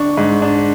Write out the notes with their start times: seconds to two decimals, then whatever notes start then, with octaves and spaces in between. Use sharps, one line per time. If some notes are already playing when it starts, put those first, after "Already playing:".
Already playing: D4 C#6
0.17 G#2
0.42 D4